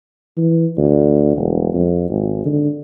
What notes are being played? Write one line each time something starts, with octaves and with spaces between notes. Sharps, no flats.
E3
D2
E1
F2
G#1
D3